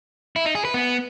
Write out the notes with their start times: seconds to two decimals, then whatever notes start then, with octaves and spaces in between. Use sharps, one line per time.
0.36 E4
0.46 D#4
0.55 G#4
0.65 B4
0.74 B3